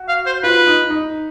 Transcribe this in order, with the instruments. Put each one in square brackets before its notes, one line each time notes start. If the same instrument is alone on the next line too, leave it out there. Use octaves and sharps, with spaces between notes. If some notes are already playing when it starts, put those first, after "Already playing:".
Already playing: [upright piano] F#4
[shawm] F5
C5
[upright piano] F4 [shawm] B4
[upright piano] D#4
D#4